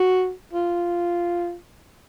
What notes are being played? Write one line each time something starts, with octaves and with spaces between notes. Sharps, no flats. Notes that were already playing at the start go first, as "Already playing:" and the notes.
Already playing: F#4
F4